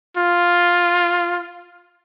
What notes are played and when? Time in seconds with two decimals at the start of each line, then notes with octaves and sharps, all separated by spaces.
0.17 F4